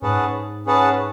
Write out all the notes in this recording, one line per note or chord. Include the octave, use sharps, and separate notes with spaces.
G#2 C#4 G#4 B4 F#5 A5
C#4 G#4 B4 F#5 A5